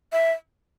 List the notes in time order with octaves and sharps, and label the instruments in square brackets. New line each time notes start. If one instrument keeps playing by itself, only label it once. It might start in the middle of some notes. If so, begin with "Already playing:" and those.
[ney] E5